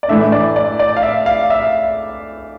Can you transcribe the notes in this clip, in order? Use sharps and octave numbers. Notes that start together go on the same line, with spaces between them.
D5
A2 E3 A3 D4 E5
D5
D5
D5
F5
E5
F5
E5